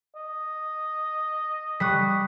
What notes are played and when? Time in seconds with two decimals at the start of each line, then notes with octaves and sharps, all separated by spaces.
0.16 D#5
1.80 G3 C#6 D#6 F#6 B6